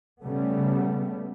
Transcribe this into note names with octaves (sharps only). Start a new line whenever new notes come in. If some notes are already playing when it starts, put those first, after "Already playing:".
C#3 G3 A3 B3